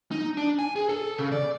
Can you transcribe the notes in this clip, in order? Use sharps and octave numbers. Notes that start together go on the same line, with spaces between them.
D#4
D4
G#5
G#4
A4
C#3
D5